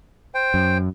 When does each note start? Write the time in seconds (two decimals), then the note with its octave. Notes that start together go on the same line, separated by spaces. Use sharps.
0.34 C5 G5
0.54 F#2